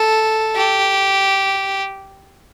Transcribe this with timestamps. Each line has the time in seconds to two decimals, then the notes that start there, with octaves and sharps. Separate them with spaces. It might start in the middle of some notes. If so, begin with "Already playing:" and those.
Already playing: A4
0.56 G4